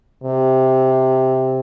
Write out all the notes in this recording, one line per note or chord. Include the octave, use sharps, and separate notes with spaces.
C3